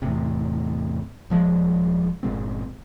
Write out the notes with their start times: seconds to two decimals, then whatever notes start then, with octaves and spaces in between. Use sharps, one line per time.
0.02 E2 A2 C3
1.30 D#1 F3 G#3
2.23 G1 A#2 G#3 C4